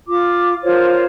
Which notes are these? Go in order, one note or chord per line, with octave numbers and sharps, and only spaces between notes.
F4 D6
F4 A#4 C5 C#5